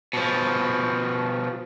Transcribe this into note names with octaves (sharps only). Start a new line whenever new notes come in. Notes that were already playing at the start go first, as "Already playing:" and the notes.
B2 F3